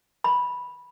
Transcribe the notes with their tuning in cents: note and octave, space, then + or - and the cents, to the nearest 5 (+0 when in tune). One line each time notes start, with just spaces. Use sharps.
B5 -10